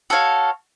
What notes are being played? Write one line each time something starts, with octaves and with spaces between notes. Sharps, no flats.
F#4 A4 C#5 F5